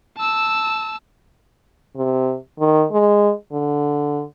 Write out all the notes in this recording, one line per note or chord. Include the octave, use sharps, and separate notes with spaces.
A5 E6
C3
D#3
G#3
D3